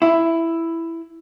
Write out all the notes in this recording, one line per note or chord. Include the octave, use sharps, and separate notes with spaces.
E4